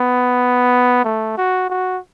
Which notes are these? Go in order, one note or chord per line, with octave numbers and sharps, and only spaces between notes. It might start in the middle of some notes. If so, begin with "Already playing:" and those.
Already playing: B3
A3
F#4
F#4